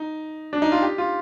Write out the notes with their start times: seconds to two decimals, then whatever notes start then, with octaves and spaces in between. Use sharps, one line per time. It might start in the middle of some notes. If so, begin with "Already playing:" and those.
Already playing: D#4
0.53 D4
0.62 D#4
0.72 F4
0.82 G4
0.98 F4